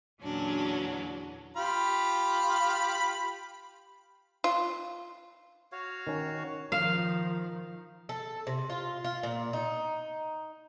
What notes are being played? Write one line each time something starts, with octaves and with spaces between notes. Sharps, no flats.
E2 A#2 D3 F#3 C#4 D4
F4 G4 B5
F4
F#4 C#5 F5
D#3 C#4
D#3 F3 F5
A4
C3
F4
F4
A#2
D#4